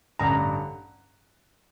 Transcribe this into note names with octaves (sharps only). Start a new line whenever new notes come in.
A1 G2 D3 A#5